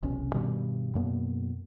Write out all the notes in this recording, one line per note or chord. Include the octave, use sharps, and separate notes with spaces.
E1 B1 C3 C#4
G2 B2 D#3 G3
F#2 B2 A#3 B3